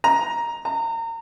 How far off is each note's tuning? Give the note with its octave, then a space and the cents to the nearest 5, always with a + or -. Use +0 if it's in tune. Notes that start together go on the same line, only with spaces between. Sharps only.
A#5 +10
A#5 -30